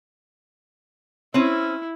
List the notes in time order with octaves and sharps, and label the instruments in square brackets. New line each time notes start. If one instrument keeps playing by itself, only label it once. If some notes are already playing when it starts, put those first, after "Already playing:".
[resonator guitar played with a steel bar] C4 C#4 [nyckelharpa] E4